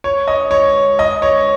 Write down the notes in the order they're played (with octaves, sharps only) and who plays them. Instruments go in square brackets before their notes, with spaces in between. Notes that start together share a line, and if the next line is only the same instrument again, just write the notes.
[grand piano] C#5
D#5
C#5
D#5
C#5